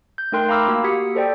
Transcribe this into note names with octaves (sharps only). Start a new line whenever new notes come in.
G6
A3 D#4 A#4 G5 C6 F#6
F5 A#5 B5 D6 E6 F6
A#3 F#4 E6
F#4 G4 D#6 B6 C#7
A4 C5 D5 G5